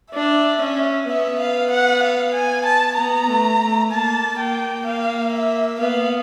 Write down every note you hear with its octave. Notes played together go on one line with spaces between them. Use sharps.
D4 E5
C#4
B3 E5
F5
F#5
F5
G#5
A5
B3 A#5
A3
A3
A#3 A5
A#3 G5
A#3 F5
E5
B3 F5